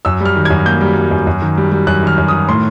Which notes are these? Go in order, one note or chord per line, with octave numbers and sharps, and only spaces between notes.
F#2 E6
G3 F6
D#3
G#6
F#2
A#3 G6
G3
G3
F#2
F#2
D#3
G3
G3
F#2 F#6
D#3 F6
F#2
D#6
D#3
A2 C6